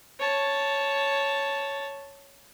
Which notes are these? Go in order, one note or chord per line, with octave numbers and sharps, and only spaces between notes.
C#5 A5